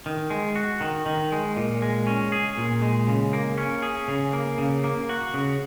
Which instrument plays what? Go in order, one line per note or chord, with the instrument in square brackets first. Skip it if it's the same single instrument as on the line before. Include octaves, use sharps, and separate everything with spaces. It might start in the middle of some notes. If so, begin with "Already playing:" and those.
[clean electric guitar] D#3
G#3
F#4
D#3
D#3
G#3
A#2
G#3
C#4
G#4
A#2
G#3
C#3
A#3
C#4
G#4
C#3
A#3
C#3
A#3
F#4
C#3